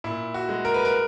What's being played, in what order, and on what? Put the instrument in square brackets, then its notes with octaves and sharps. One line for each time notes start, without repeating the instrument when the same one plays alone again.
[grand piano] A#2 E4
F#4
G#3
A#4
B4
A#4